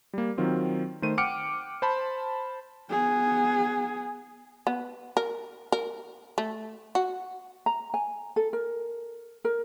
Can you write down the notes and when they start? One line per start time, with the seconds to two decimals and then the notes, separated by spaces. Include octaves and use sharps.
0.13 G3 A#3
0.38 D#3 F#3 C4 F4
1.02 D#3 A3 C5 D#7
1.18 F#5 G5 D6 F6 C#7 D7
1.82 C5 A5 B5
2.90 B3 G#4
4.67 B3
5.17 A#4
5.72 A#4
6.38 A3
6.95 F#4
7.66 A#5
7.94 G#5
8.36 A4
8.53 A#4
9.45 A#4